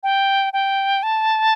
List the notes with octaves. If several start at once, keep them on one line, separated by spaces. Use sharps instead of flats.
G5
G5
A5